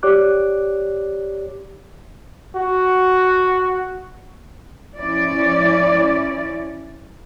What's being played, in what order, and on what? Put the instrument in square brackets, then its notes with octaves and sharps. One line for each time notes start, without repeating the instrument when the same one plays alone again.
[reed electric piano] G4 C#5 D5 D6 F#6
[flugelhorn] F#4
[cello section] F3 C#4 E4 D5